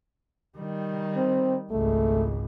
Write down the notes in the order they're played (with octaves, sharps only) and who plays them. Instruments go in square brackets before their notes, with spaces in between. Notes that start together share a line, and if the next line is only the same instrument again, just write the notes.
[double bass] D#3 G3
[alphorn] C4
[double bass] G#1 C#2 [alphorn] A3